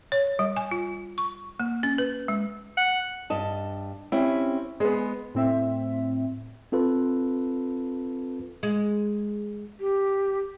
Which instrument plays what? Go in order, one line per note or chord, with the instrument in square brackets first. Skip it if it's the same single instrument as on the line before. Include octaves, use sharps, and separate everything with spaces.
[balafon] C#5
G3
G#5
F4
C#6
A#3
C#4
B4
G#3
[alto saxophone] F#5
[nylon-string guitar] G2 D#5 A5
[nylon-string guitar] C4 C#4 G4 [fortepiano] E4
[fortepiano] G#3 B3 [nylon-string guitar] G#4 C5
[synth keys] A2 C4 E5
[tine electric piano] C4 F4 A4 B4
[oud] G#3
[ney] G4